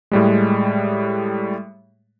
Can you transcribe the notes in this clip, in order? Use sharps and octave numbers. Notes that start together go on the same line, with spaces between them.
A2 G3 G#3